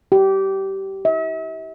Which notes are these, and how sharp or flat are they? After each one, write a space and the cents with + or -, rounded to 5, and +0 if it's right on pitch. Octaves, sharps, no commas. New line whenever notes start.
G4 -20
E5 -40